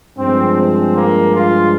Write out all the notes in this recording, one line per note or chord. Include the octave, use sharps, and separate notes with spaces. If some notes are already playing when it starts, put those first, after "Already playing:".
G2 F3 G#3 C4
C4
A#3
F4